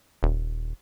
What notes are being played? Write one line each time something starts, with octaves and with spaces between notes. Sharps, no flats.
D#1